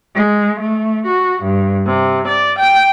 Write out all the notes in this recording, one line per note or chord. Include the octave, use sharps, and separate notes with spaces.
G#3
A3
F#4
G2
C3
D5
G5